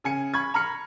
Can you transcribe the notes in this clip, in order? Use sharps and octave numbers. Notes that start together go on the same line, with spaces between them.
C#3 G#5 C#7
B5 C#6 G#6
A#5 B5 F6 C#7